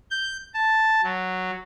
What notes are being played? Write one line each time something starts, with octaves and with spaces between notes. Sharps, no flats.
G6
A5
F#3